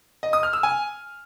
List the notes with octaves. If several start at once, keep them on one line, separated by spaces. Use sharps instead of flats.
D#5
D#6
F6
E6
G#5